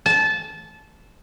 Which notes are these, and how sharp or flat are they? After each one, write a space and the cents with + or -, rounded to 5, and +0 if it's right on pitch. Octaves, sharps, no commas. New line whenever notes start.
A5 -20